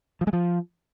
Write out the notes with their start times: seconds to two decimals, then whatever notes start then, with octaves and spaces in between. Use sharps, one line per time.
0.21 F3
0.27 G#3
0.33 F3